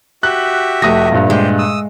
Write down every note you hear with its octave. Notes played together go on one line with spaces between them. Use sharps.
F#4 G4 E5 F#6
F1 A3 D#6 A#6
G2 A#2
G#3 G4 C5
D#6 E6